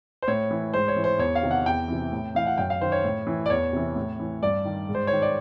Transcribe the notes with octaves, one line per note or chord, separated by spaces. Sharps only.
C5
A2 C#5
E3
G#2 C5
C#5
E3
C5
E2 C#5
F5
C3 D#3
F#5
E2 G5
C3 E3
A2
E3 F5
F#5
F#2 G5
F5
D#3 C5
C#5
A2
E3
D5
E2 C#5
C3 E3
A2
E3
G2 D5
D#3
G#2
C5
C#5
D#3
D5